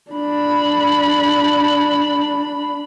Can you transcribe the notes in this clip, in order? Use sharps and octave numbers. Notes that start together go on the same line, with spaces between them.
D4 B5